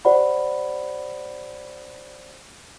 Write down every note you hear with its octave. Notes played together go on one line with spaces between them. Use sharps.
G4 C5 D5 F#5 B5